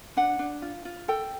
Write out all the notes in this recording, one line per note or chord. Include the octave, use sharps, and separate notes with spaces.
D4 F#5
D4
F4
F4
A4 G5